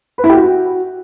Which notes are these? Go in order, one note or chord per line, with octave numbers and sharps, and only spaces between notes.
B4
E4
G4
F#4